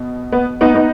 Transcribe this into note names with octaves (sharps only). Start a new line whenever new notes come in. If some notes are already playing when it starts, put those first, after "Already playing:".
Already playing: B2
B3
B3 D#4
B3 D#4